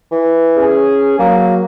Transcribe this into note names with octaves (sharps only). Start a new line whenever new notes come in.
E3
C#4 G#4
F#3 A#3